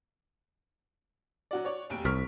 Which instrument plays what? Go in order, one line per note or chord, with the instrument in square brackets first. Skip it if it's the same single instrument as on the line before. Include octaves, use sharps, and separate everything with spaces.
[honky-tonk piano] F#3 F#4 D5
C#5 D5
F1 D#2 D7
[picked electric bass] C2 [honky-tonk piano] C#6 F6 B6